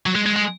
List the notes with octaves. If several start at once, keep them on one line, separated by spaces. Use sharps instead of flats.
F#3
G#3
G#3
G#3